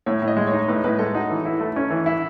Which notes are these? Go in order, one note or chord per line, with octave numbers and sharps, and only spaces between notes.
A2 C#5
A2
D#5
G#3
C#5
D#4
A2 B4
A2 B4
G#3 A4
D#4 F#4
E3
E4
A3
C#4
E3
E4